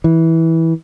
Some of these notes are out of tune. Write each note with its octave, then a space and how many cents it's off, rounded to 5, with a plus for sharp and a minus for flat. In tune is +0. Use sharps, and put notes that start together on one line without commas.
E3 -15